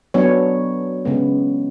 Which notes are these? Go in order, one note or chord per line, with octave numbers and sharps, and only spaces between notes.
F#3 B3 D4 C#5
C#3 G#3 B3